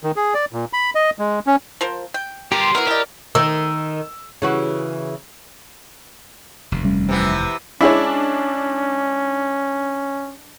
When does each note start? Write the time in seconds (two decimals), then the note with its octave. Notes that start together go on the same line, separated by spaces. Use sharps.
0.03 D#3
0.16 G#4
0.34 D5
0.53 A#2
0.73 B5
0.95 D#5
1.19 G#3
1.47 C#4
1.81 F3 A#4 C5
2.14 G5
2.52 G2 F4 G4 A#4 C6
2.75 E3 F#3 B3 G#4 A#4
2.87 E4 G4 D5 D#5
3.35 D#3 E6
4.42 C#3 E3 F#4
6.72 F1 D#2
6.85 G3 C#4
7.09 C3 E3 B3
7.81 G#3 C#4 D4 E4 G#4 C#5